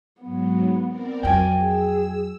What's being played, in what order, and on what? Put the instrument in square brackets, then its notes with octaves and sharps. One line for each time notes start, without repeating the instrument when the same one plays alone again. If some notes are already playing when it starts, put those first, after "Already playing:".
[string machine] G#2 F#3 [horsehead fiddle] B3
[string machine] C4 A#4 D5
[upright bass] F2 F#3 [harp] G5 G#5
[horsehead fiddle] G#4 [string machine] E6